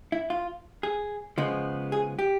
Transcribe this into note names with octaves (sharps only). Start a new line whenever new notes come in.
E4
F4
G#4
C#3 F3 G#3 B3
G#4
G4